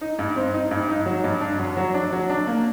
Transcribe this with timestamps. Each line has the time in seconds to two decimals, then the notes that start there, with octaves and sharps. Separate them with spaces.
0.01 D#4
0.19 G2
0.36 C4
0.54 D#4
0.71 G2
0.89 D#4
1.06 F#3
1.24 G2
1.41 D4
1.59 F#2
1.77 F#3
1.94 D4
2.12 F#3
2.30 D4
2.47 A#3